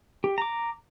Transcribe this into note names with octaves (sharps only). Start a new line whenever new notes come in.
G4
A#5 D6